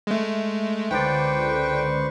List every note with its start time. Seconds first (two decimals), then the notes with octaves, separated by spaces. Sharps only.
0.07 G#3 A3
0.91 C#2 D3 B4 C5 D5 G5 C#6